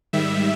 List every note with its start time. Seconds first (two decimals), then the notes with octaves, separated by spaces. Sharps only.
0.13 G#2 D#3 G3 E5